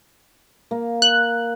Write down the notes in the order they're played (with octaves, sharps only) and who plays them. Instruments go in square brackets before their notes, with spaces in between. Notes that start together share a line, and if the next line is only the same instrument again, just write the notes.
[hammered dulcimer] A#3
[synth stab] F#6